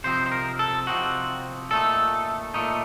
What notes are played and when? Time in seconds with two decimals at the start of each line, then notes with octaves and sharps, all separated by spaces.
0.04 C3 F3 C4 D#4 C5
0.26 C5
0.32 A#4
0.59 A4
0.87 C3 F3 C4 D#4 F#4
1.71 A#2 A3 D#4 A4
2.54 A#2 A3 D#4